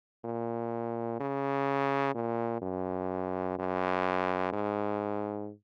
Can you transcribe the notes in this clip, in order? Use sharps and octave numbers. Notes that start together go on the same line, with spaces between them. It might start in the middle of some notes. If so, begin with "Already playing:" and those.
A#2
C#3
A#2
F#2
F#2
G#2